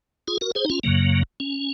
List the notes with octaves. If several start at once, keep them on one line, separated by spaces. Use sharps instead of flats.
F4 G#4
F#4 A#4
G#4 C5
D#4
C#4 F4
F#2 C#3 F#3 A#3
C#4